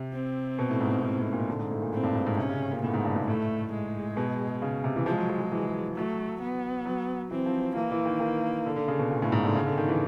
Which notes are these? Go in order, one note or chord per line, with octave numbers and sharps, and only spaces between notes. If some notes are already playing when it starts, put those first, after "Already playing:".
Already playing: C3
C4
B2
A2
G#2
G#2
G#2
A2
A#2
D3
G#2
A2
A#2
A2 C4
G2
G#2
G#2
C3 C#4
C#3
A#2
A2 B3
G#2
G2
G#2
A2 A3
G#3
B2
C#3
C3
E3
F3 G#3
F#3
F3
F3
E3
F#3 A3
B3
F#3
E3 C4
F3
E3 A#3
E3
D#3
D#3
D3
D3
C#3
B2
A#2 B3
A2
G#2
D3
C#3
D3
D#3
E3